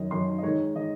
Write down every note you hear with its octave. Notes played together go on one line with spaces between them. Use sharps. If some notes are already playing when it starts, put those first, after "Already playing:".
Already playing: F#2 D#3 D#5
F#2 D#3 C6
D#5
G#2 D#3 C#5
D#3 D#5